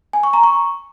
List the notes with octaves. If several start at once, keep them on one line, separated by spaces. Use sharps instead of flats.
G#5
C#6
A#5
C#6